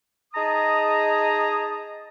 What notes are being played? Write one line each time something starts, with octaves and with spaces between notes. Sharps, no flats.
D#4 G#4 A5 A#5 D#6